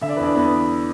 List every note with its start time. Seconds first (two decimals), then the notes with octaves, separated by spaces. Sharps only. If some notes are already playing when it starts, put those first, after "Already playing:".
0.01 D3 E5
0.09 D5
0.16 E2 B4
0.23 D4 D5
0.35 E2 B3 B4